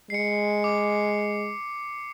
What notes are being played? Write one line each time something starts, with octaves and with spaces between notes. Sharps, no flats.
G#3 C7 C#7
D6